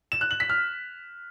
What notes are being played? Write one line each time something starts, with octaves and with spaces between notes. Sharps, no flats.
E7
F#6
F#7
B6
F6